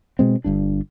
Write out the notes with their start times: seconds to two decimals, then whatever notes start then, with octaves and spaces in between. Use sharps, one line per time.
0.19 B2 G#3 C4
0.44 G1 G2 D4